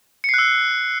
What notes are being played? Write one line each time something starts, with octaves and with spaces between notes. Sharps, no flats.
E6 F#6 C7 C#7